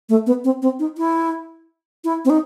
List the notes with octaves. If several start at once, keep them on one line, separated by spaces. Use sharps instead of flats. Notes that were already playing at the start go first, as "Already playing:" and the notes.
A3
B3
C4
C4
D#4
E4
E4
C4
D#4